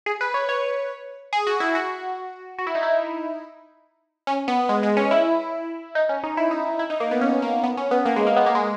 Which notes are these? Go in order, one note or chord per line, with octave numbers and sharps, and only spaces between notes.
G#4
B4
C#5
C#5
G#4
F#4
E4
F#4
F#4
E4
D#4
E4
C#4
B3
G#3
G#3
C#4
E4
D#4
C#4
D#4
E4
D#4
E4
D#4
A#3
B3
C#4
A#3
B3
C#4
B3
A#3
G#3
A#3
B3
A#3
G#3